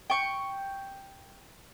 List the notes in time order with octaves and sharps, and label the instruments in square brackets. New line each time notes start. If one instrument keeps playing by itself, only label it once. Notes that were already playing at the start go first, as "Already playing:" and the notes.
[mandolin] G5 C#6